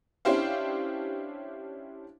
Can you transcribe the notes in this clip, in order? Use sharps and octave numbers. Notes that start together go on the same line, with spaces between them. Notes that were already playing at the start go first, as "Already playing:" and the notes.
C#4 D4 E4 G4 C5 F5